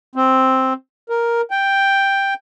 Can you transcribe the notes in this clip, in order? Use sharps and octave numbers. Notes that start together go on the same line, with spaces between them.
C4
A#4
G5